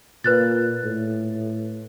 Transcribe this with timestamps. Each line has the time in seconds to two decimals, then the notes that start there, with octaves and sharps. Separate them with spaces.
0.24 A#2 B4 F#6 A6
0.84 A2